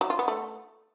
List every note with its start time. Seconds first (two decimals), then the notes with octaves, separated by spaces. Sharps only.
0.01 F#3
0.10 F4
0.19 B3
0.28 A3